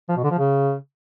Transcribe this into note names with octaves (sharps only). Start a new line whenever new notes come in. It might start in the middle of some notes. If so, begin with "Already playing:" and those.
F3
B2
D3
F3
C#3